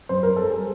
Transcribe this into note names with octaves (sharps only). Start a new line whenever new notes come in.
F#2 C5
A#4
G3 A4
G#4